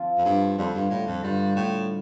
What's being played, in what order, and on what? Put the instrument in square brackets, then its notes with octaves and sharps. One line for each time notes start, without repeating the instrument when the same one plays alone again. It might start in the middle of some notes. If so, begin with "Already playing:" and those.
Already playing: [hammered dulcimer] F3 C4 F4
[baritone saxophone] F2
G2
[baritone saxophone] F2 [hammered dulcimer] D3 G3 F4
[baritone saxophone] G2
A2
F2
[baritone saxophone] G2 [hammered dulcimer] D3 G3 F4
[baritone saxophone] A2